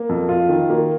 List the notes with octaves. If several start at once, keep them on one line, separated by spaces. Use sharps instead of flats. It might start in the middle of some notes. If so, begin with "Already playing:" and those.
Already playing: A#3
F2
F4
D#3
A#3